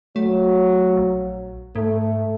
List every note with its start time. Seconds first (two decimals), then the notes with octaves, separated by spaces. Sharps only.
0.16 F#3 A3
0.97 A#1
1.76 G#2 A3